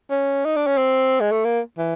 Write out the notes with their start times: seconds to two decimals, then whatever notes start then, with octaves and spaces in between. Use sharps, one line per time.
0.10 C#4
0.45 D#4
0.56 D4
0.67 C#4
0.77 C4
1.20 G#3
1.32 A3
1.45 A#3
1.78 E3